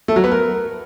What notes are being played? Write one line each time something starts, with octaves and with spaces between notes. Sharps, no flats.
A3
F#3
B3
A#4